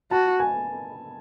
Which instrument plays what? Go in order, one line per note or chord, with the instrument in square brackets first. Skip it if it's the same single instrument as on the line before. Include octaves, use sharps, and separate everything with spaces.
[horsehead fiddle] F#4 [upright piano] A5
[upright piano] G#5